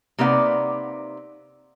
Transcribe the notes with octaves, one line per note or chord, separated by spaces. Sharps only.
C3 A#3 D#4 B4 D5 F#5